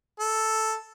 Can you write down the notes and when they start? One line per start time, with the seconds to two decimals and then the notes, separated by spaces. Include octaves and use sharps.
0.19 A4